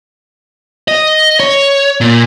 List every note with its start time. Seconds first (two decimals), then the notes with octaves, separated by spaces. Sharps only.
0.88 D#5
1.40 C#5
2.01 A#2